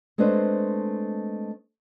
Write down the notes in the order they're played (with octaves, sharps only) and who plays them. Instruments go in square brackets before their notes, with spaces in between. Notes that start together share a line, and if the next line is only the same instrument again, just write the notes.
[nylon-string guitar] G#3 A3 C4 D4 B4 C5